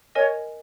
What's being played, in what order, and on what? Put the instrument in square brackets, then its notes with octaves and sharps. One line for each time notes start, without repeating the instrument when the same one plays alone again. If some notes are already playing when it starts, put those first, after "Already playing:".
[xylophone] A#4 D#5 G#5 [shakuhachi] C#5